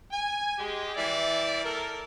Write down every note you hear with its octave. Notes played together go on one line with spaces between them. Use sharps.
G#5
G#3 G4
E3 G3 E4 D5
A#3 A4 A#4